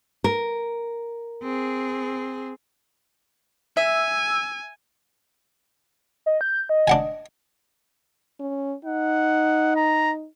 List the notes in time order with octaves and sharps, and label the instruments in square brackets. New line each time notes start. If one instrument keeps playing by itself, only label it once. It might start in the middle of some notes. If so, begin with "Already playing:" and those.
[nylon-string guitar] A#4
[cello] C4 G#4
[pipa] E5 [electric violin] G#5 [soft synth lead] E6
[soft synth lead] D#5
G6
D#5
[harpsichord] D4 F#5 G#5
[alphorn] C#4
[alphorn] D#4 [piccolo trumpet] F#5
[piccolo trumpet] A#5